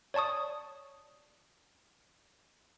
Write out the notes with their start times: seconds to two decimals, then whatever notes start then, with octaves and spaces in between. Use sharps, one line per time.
0.14 C#5 D5 A5 C#6 D#6